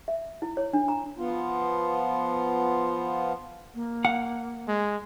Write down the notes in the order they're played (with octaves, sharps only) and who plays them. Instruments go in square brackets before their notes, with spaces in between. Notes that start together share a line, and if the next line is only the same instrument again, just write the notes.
[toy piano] E5
E4
C#5
D4
A#5
[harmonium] F3 B3 F4
[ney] A#3
[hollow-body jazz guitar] F5 F#5
[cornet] G#3